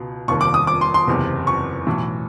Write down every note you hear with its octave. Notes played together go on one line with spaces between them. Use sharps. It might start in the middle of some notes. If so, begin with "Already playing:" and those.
Already playing: C#2 B2
F1 D#2 D#3 C#6
D6
D#6
D6
C6
C6
F#1 E2 C3
C#6
B1 A2 E3